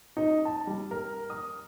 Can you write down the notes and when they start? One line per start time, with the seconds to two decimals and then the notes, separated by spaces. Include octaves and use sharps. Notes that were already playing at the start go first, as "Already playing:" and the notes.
0.17 D#4
0.45 A5
0.67 G3
0.91 A#4
1.30 D#6